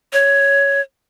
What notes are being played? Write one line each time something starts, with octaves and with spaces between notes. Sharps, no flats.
C#5